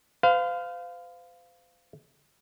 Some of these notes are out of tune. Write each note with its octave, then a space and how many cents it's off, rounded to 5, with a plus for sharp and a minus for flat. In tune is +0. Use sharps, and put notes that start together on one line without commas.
C5 -45 F5 +0